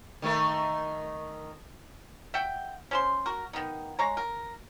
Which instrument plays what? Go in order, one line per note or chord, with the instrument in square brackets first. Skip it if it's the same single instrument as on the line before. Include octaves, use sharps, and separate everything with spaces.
[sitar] D#3 A3 A#4
[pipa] E5 F#5 G5
C#4 C5 C6
F#4 A#4
D#3 B3 D#4
G#3 C#5 A#5
A#4